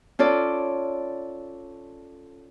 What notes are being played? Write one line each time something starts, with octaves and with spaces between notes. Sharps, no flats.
C#4 F4 A4 D5